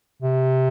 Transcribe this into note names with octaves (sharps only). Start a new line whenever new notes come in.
C3